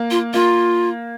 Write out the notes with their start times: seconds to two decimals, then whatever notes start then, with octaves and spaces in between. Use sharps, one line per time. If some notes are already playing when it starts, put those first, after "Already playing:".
Already playing: A#3
0.11 F4
0.34 A#3 F4